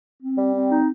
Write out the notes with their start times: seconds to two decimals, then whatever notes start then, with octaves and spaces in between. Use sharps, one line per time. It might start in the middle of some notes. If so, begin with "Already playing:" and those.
0.22 C4
0.38 G3
0.54 C4
0.70 D#4